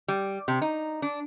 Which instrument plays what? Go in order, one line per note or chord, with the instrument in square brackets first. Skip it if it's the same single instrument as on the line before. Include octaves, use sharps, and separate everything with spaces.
[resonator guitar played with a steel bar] G3
C3
D#4
D4